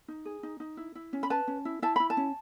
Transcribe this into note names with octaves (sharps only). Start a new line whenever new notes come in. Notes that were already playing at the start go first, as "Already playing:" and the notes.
D#4
G#4
D#4
D#4
E4
E4
C#4
B5
B4 A5
C#4
E4
E4 A5
E4 B5
A5
C#4